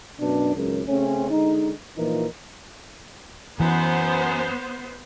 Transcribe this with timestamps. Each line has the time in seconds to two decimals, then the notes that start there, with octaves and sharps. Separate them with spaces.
0.20 F#2 B2 D4
0.55 G#1 C#2 F#2
0.87 C#3 A3 C4 C#4
1.30 D3 G#3 D#4
1.97 A#2 E3 F3 D#4 A#4
3.60 F#2 E3 B3 C5